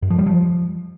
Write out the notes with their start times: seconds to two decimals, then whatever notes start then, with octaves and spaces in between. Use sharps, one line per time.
0.02 F#2
0.10 F3
0.18 G3
0.26 F3